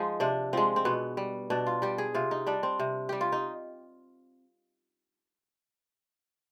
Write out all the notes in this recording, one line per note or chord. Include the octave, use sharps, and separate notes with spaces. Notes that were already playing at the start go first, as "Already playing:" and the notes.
Already playing: F3 G#3 D#4
C3 D4
F3 G#3 C4
C4
B2 B3
G3
B2 D4
F4
G3 G4
G#4
C3 F4
D#4
G3 D4
C4
C3
G3 G4
F4
D#4